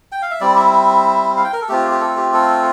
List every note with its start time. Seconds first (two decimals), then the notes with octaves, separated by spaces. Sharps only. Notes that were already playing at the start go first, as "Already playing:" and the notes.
0.12 G5
0.22 F5
0.31 E5
0.41 G3 C4 E4 D5
0.56 E5
0.73 E5
1.37 F5
1.44 G5
1.53 A#4
1.62 A4
1.68 A3 C4 F4 G4
1.91 G4
2.01 A4
2.17 G4
2.34 A4